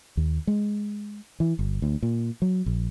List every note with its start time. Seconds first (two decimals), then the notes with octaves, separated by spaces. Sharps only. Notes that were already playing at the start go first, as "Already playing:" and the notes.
0.17 D#2
0.47 G#3
1.40 E3
1.59 G1
1.82 D2
2.03 A#2
2.42 F#3
2.66 A#1